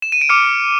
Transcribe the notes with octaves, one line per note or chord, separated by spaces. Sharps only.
E7
D#7
D7
D6 F6 C#7